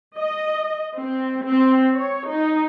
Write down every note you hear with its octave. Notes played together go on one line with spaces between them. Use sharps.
D#5
C4
C4
C#5
D#4